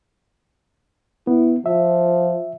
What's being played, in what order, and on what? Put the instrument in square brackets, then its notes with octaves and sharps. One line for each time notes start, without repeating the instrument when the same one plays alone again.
[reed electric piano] B3 [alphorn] E4
[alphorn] F3 [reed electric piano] E5